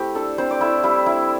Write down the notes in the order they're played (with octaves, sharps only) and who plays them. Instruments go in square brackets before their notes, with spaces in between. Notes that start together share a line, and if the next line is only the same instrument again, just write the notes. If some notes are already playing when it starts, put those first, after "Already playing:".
Already playing: [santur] A3 C4 E4 G4
D4 A4
C4 D4 C5
D5
A3 E4 E5
G3 E4 E5
D4 E4 E5